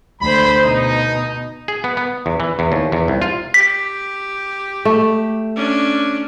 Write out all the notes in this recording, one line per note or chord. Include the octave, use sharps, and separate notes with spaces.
D2 C5 B5
B2 D#4
G#4
B3
B3
E2
E3
E2
D#2
E2
C2
F4
G4 B6
A3
C#4 D4